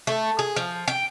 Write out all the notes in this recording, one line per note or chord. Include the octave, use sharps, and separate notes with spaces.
A3
G#4
F3
G5